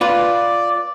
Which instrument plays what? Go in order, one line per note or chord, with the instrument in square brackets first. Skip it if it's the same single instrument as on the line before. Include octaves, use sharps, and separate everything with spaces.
[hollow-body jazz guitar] F4 B4 [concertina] D5